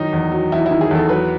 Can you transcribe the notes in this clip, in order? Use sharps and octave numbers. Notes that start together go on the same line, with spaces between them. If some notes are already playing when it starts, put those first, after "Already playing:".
Already playing: F#2 D#3 D#4
E2
F#3
E2 E4
D#3 E4
G#4
E2 A4
F#3 B4